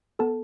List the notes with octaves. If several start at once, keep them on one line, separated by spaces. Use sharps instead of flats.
B3 A4 A5